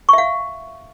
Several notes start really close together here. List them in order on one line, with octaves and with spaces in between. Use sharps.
C#6 E5 F5